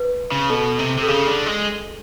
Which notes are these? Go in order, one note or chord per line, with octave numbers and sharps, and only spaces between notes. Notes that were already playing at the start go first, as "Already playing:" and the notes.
Already playing: B4
C#3
B2 A4
C3
C3
A4
C#3 G#4
D3
G#3